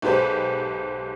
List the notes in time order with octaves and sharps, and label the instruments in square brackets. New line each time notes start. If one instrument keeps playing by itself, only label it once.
[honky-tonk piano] B1 G#2 G4 B4 C5